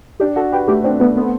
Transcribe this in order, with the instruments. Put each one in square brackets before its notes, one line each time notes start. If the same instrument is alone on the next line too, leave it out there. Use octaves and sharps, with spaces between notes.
[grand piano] D4 [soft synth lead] G4
[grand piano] F#4 [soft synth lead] A4
[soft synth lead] G4 [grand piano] B4
[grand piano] A3 [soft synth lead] G4
[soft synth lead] C4 [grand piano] D4
[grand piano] A3 [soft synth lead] B3
[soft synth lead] B3 [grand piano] C4